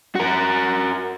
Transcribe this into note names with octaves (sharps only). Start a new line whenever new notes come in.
F#4 A#4